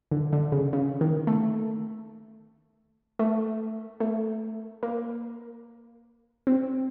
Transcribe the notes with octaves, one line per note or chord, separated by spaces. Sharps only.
D3
D3
C#3
C#3
D#3
A3
A3
A3
A#3
C4